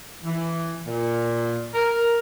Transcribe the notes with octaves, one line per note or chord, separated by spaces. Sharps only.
E3
A#2
A#4